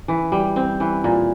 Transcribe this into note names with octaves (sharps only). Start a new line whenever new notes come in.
E3
G3
C4
E3
A#2